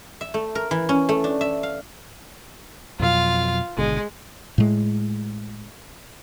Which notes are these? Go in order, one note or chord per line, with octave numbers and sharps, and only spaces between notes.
E5
A3
A#4
E3
C#4
A3
D4
E5
F5
F2 B2 F#3 F4 F5
G#1 B2 D3 G#3
A2 G#3